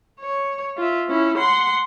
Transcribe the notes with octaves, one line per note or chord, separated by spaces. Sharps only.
C#5
F4 E5
C#4 E4
F#5 C6